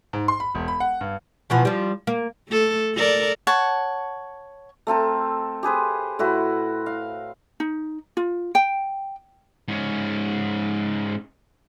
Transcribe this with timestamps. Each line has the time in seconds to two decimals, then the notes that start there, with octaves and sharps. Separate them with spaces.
0.13 G#2
0.28 C6
0.40 B5
0.55 E1
0.68 B5
0.80 F#5
1.01 G2
1.50 B2 E3 F3
1.65 F3 G3
2.07 A#3
2.48 A3 A4
2.95 A4 A#4 D5
3.47 C#5 F#5 A5
4.87 A3 C4 A4 A#4
5.63 G4 G#4 B4 C5
6.19 A2 E4 F#4 B4
6.86 F5
7.60 D#4
8.17 F4
8.55 G5
9.68 G#2 C#4